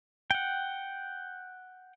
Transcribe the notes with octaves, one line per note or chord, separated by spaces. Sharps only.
F#5 G5